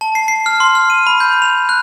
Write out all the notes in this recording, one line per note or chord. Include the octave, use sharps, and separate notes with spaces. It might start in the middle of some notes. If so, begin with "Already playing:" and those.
A5
C7
C7
F6
C6
F6
D#7
B5
G6
F7
F#6